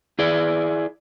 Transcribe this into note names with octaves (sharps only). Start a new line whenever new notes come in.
E4 G#4 D5